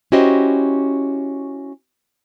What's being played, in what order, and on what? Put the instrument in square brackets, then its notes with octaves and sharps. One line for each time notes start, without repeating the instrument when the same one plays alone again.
[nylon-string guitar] C#4 E4 F#4 G4 C5 D#5